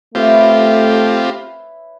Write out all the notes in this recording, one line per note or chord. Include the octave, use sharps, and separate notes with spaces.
A3 C4 E4 F4 G4 B4 C#5